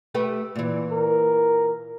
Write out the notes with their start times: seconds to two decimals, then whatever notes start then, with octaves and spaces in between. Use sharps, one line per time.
0.15 A3 G4 B4
0.56 A#2 E3
0.92 A#4